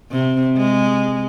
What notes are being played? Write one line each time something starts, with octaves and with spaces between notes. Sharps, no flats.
C3
G#3